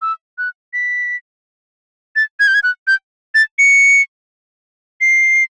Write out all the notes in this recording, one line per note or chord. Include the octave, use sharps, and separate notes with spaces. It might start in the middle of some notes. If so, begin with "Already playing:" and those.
E6
F#6
B6
A6
G#6
G6
G#6
F#6
G6
A6
C#7
C7